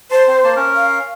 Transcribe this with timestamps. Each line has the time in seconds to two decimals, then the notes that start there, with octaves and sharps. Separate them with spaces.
0.11 C5 A5 C6
0.27 C4
0.44 A#3 A5
0.56 C#4 A#4
0.75 F5